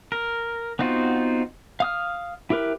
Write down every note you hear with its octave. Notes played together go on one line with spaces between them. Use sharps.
A#4
B3 C4 D#4 F4 F#4
F5 D#6 F6
E4 G4 A#4 B4